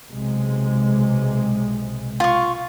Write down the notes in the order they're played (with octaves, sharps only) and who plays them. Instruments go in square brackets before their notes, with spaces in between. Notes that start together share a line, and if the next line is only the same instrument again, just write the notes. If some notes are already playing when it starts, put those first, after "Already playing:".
[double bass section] B1 C3 G#3
[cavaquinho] F4 C#6